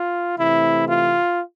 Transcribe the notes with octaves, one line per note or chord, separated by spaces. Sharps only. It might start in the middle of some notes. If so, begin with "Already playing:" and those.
Already playing: F4
C3 E3 A3 C4 E4
F4